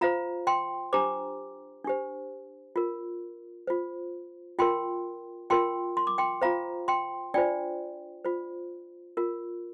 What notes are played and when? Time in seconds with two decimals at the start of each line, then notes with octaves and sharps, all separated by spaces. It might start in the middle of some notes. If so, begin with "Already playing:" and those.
0.01 F4 C5 F5 A#5
0.47 G5 C6
0.93 D4 G4 C5 A#5 D6
1.85 D4 G4 C5
2.76 F4 A#4
3.67 F4 C5
4.59 F4 A#4 G5 C6
5.50 F4 A#4 G5 C6
5.97 C6
6.07 D6
6.18 G5 C6
6.42 F4 C5 F5 A#5
6.88 G5 C6
7.34 D4 F4 C5 D5 G5
8.25 F4 C5
9.17 F4 A#4